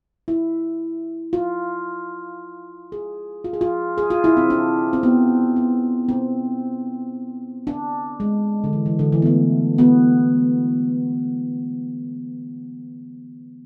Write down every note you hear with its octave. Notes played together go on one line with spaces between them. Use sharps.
E4
F4
G#4
F4
G#4
F4
G#4
F4
E4
C4
D4
C4
B3
B3
C4
D4
G#3
D3
E3
E3
D3
E3
B3
A3
B3